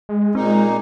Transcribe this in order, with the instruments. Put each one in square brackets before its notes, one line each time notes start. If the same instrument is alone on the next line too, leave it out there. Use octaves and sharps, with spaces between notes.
[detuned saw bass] G#3
[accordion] A#2 A#3 D#4 [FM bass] C4